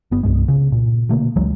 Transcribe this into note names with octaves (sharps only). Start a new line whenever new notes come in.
G1 B3
C2 G2 G#3
C#3
A#2
B2 D3 A3 A#3
C#2 E3 F#3 G#3